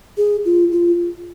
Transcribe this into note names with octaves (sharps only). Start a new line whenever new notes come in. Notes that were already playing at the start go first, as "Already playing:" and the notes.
G#4
F4
F4